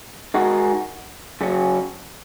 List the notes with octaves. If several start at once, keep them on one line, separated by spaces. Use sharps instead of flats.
D#3 G#3 D#4 F#4
F#2 C#3 F#3 C#4